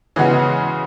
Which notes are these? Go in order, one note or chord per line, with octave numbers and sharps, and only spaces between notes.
C#3 E3 G#3 B3 F#4